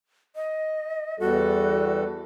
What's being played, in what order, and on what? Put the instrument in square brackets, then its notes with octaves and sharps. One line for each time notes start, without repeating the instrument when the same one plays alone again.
[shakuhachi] D#5
[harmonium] E2 G3 A4 [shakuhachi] F#4